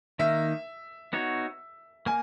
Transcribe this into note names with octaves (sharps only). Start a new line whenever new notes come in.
D#3 A#3 D#4 E5
B3 D#4 F#4 C#5
A#3 G#5